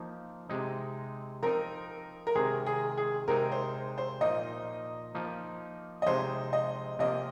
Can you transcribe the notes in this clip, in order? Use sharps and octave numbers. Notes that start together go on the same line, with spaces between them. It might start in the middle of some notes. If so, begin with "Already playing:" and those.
Already playing: F3 A#3 D#4
C3 G#3 D#4
F3 C4 D#4 A#4
A#4
C3 D#3 G#3 G#4
G#4
G#4
C3 G#3 C4 D#4 A#4
C5
C5
A#2 F3 A#3 D#4 D#5
F3 A#3 D#4
D#5
C3 F3 G#3 D#4 C5
D#5
C3 F3 A#3 D#5